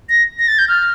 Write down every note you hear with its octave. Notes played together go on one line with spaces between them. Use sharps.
A#6
A#6
A6
G6
F6